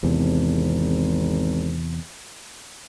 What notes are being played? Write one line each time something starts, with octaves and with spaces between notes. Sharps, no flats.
G#1 E2 C3